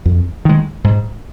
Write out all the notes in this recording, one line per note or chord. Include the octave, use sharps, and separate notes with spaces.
F2
D#3 G#3
G#2